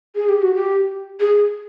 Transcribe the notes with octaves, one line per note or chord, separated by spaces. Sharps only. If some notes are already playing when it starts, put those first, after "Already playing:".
G#4
G4
F#4
G4
G#4